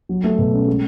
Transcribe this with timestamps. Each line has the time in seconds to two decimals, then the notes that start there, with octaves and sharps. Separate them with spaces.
0.09 F#3
0.24 A3
0.38 B2
0.53 C#4
0.67 G#3